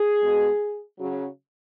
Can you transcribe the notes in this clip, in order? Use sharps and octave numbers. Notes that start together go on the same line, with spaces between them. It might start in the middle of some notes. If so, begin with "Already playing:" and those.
Already playing: G#4
B2 G#3
C#3 F#3